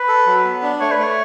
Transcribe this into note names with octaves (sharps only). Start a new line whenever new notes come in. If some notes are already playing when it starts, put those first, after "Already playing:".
Already playing: B4
A4
F#3
B3
D4
A3 C#5
B4
A3
C#5